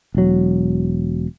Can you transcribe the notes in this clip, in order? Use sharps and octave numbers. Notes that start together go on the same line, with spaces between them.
E1 F#3